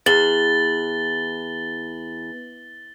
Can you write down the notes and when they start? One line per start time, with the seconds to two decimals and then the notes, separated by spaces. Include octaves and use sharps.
0.06 E2 A6 F#7 G7